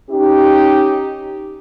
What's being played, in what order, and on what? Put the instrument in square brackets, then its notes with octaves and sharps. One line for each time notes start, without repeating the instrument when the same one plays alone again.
[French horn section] C#4 D#4 G4